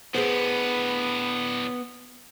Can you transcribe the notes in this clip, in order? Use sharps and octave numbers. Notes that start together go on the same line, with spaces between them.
A2 D3 B3 G#4 B4 C5